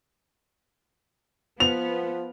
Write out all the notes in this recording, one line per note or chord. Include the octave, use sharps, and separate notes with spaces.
F3 B3 F7